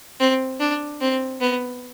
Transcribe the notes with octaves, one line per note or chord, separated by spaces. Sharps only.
C4
D4
C4
B3